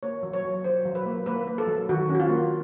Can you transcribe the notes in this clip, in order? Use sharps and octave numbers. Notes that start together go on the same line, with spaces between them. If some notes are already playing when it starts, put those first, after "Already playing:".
A#3 C#5
F#3
C#5
F#3
F#3 C5
F#3
B4
A#3
A#3 B4
A#3
A4
F#3
D#3 F#4
C#4
F#4
F4
A#3